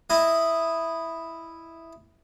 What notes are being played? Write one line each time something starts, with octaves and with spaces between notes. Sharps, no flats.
E4 D#5